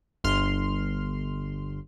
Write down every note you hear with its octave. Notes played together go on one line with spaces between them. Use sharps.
G1 C6 F6